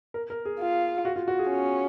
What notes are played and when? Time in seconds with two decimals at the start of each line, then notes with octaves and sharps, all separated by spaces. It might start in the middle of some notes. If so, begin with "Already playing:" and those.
0.14 A#4
0.30 A#4
0.45 G#4
0.60 F4
1.05 F#4
1.16 F4
1.28 F#4
1.39 G#4
1.50 C#4